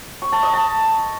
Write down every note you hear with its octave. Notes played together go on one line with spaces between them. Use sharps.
C#6
A5
D#5
A5